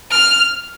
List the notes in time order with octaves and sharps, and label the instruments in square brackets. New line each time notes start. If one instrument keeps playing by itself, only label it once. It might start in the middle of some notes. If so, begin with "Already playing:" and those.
[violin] F6